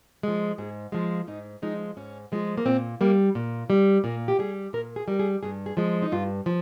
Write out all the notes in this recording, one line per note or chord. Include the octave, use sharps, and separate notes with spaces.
F3 G#3
G#2 G#4
F3 G#3 F4
G#2 D#4
F3 G#3 D#4
G#2 C#4
F3 G#3
A#3
A#2 C4
G3 A#3
A#2
G3
A#2 A#3
G4
G3 G#4
A#2 A#4
G#4
G3 A#4
G#4
G2 G#4
G#4
F3 G#3
D#4
G2 F4
F3